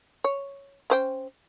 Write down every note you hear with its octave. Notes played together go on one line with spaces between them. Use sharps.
C#5
C#4 C5 G5